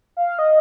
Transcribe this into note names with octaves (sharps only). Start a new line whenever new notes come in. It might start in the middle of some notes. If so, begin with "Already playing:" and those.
F5
D#5